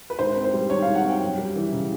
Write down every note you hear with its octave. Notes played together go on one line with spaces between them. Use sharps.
B4
G#2 C5
C4
C5
G3
D#3 C#5
F5
G#2
F#5
C4 G5
F#2
G3
E3
C#3